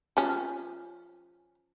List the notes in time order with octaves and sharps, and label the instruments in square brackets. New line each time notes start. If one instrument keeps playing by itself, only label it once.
[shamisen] F3 C#4